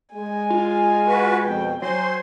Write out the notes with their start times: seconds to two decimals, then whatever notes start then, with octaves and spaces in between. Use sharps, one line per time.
0.14 G#3 G#5
0.50 F4
1.08 F#4 B4
1.44 F2 B2 G5
1.82 F#3 C5 G#5 C6